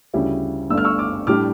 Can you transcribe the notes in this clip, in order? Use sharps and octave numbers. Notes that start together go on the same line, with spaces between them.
D2 C#3 G3 C#4 E4
G1 G2 D3 A3 E6
F6
C#6 E6
D6 F6
A2 G3 D4 D6 F6